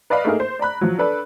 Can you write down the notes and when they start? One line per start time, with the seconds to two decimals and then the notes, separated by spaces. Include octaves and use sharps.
0.10 B4 D5 D#5 F5 B5
0.25 A3 A#3 D#4 G#4 A#4
0.40 C5
0.59 D5 A#5 B5 F#6
0.81 F3 F#3
0.98 D4 A4 B4 D5